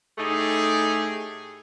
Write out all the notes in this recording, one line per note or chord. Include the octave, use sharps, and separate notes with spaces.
A2 A3 D#4 G4 G#4